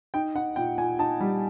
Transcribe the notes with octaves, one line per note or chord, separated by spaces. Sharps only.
D#4 G5
D#4 F#5
A#2 G5
A#2 G#5
D#4 A5
G3